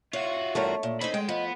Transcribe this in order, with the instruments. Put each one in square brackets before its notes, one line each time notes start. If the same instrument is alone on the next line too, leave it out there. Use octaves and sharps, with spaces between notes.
[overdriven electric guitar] F4 F#4 [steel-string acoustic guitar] C#5 [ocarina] E5
[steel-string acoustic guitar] E2 G2 A#4 [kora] A3 C#5
[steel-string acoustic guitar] A#2
[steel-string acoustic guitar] C4 C#4 D#4 [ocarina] D#5 [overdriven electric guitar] B5
[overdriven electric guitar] G#3 [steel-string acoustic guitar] G5
[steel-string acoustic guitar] F3 [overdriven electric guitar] B3 [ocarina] D#5